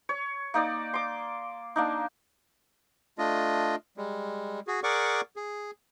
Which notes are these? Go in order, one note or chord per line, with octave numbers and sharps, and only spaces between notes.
C#5
A#3 D#4 D5
C6 D6
A#3 D4 D#4
A3 D4 F4 D#5
G3 G#3
F#4 G#4
G#4 A#4 D5 F#5 C#6 D6
G#4